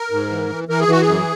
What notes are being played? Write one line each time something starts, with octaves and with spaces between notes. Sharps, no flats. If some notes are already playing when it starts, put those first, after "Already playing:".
Already playing: A#4
G#2
E3
E3
E3 A#4
G#4
E3 F#4
G#4
F#2